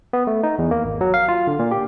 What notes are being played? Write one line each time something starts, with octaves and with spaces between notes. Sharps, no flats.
B3
A3
D#4
E2
A#3
G#1
F#3
F5
F4
D3
A#2
G4